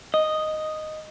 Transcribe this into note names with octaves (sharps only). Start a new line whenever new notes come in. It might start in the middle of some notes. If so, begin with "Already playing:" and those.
D#5